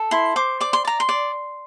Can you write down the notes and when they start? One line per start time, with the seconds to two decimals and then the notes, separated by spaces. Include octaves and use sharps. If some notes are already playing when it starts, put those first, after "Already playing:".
Already playing: A4
0.11 E4 C6
0.36 C5 D6
0.60 D5 D6
0.73 C6
0.85 D5 A#5
1.00 C6
1.09 D5